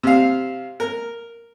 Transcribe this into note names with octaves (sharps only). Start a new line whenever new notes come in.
C3 F5
A#4